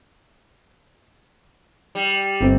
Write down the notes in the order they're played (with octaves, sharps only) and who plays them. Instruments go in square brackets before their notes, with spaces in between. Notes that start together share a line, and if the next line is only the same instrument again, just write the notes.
[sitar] G3
[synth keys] G1 [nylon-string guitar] C4